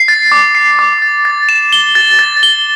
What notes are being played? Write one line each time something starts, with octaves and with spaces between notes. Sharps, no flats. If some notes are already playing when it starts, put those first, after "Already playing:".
Already playing: C7
A6
D6
C7
D6
A6
A6
E7
G7
A6
A6
G7